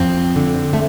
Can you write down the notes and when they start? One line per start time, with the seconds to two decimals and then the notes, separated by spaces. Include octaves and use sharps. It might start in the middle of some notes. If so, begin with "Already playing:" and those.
Already playing: F2 C4
0.36 D3
0.73 A3